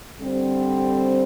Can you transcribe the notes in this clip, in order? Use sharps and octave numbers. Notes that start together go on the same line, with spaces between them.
D3 G3 C4